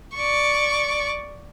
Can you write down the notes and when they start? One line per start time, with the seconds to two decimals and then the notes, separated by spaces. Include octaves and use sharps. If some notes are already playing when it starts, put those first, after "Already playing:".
0.16 D5 C#6